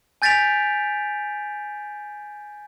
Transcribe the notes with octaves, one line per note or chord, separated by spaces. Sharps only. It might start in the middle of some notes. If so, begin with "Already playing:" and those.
G#5 G6 A6 B6 D7 F7